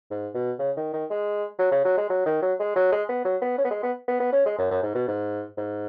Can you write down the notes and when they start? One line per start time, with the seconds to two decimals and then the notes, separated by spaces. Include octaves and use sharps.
0.11 G#2
0.35 B2
0.59 C#3
0.77 D#3
0.93 D#3
1.10 G#3
1.59 F#3
1.72 C#3
1.85 F#3
1.97 G#3
2.09 F#3
2.26 D#3
2.42 F#3
2.59 G#3
2.76 F#3
2.92 G#3
3.09 B3
3.25 F#3
3.42 B3
3.58 C#4
3.64 B3
3.71 G#3
3.83 B3
4.08 B3
4.20 B3
4.32 C#4
4.46 G#3
4.58 F#2
4.71 F#2
4.83 G#2
4.95 B2
5.08 G#2
5.57 G#2